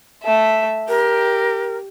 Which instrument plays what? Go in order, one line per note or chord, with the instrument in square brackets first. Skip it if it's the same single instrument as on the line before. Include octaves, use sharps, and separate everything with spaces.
[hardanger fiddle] A3 E5
[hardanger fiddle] G4 [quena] A#4